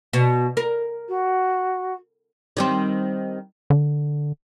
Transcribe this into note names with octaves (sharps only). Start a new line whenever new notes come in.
B2
A#4
F#4
D#3 G3 C4
D3